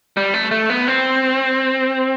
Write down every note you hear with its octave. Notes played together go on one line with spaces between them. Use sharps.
G3
A3
A3
B3
C4